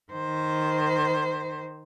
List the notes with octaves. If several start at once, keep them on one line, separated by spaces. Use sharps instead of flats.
D#3 C5